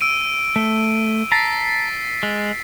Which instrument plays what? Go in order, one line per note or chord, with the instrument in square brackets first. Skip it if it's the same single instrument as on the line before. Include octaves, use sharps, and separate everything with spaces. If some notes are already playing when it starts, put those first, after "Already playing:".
[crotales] E6 D7 D#7
[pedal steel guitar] A3
[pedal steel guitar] A5 A#5 [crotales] A6 B6 C7
[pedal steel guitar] G#3